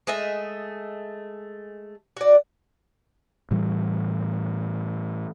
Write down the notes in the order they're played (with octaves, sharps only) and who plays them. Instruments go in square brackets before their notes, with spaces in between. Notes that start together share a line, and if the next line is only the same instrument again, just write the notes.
[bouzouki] G#3 A3 D#5 E5
F#4 D5
[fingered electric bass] A2 E3 G3